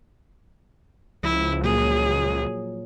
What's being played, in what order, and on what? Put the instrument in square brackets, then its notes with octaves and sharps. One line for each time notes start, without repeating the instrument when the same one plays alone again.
[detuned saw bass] C#2 [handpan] F3 [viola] E4
[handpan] A#2 F#3 A#3 [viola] G#4